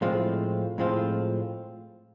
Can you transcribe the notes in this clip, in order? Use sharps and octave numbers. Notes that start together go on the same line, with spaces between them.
A2 F3 G#3 C4 F4
A2 F3 G#3 C4 F4